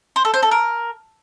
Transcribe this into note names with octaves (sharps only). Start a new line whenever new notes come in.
C5
A4
C5
A4
A#4